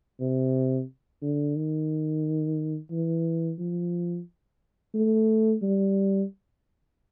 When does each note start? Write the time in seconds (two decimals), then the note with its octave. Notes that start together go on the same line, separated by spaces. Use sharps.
0.20 C3
1.22 D3
1.56 D#3
2.91 E3
3.59 F3
4.94 A3
5.62 G3